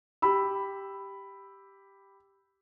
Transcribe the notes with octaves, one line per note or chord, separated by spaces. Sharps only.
G4 B5 E6